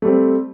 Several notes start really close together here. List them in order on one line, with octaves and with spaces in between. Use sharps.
A3 G3 C4